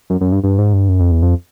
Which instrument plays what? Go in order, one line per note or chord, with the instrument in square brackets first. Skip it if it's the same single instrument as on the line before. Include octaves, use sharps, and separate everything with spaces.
[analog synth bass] F#2
F#2
G2
G2
G#2
G2
F#2
F2
E2
F2